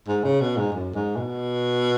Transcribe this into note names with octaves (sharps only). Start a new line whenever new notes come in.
G#2
C#3
B2
G#2
F#2
G#2
B2